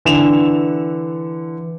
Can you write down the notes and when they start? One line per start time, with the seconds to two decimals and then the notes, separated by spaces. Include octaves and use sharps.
0.05 D3 E3 E7 F7